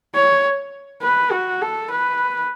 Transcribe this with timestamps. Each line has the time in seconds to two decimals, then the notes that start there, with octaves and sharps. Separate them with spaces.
0.15 C#5
1.02 B4
1.32 F#4
1.62 A4
1.90 B4